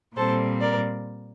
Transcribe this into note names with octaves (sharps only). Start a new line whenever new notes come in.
A#2 G3 C4 A4 C5
A#4 D5